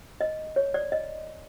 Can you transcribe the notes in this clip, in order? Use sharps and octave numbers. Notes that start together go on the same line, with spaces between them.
D#5
C#5
D5
D#5